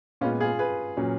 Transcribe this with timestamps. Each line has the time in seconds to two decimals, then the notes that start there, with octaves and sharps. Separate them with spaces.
0.21 A#2 G#3 B3 C#4 F4
0.41 F4 G#4
0.59 G#4 B4
0.97 A#2 F#3 C#4